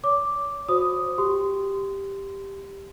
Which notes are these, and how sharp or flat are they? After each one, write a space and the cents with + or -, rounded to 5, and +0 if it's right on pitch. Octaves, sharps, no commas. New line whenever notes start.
C#5 +35 D6 +0
F#4 -30 C5 +0 D#6 +0
G4 +5 C6 -25